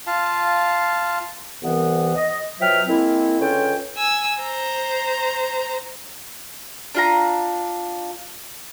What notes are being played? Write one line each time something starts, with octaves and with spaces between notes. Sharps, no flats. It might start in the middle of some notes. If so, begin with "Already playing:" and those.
F4 F5 A5
C2 E3 B3
D#5
B2 F3 F#3 E5 G5 F6
G#3 A#3 C4 E4
C#2 D3 C#4 F4 C#5 G5
G#5 E6
C5 A#5
D4 F4 A#5